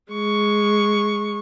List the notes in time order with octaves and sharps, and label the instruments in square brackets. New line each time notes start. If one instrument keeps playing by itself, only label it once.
[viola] G#3 C#6